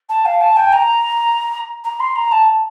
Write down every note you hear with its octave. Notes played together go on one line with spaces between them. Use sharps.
A5
F5
A5
G5
A#5
A#5
C6
A#5
A5